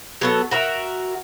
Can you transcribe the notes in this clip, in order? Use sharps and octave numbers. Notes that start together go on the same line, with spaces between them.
F#3 B3 A4
F#4 A#4 E5